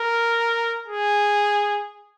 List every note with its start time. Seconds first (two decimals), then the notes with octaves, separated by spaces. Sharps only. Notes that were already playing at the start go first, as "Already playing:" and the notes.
Already playing: A#4
0.88 G#4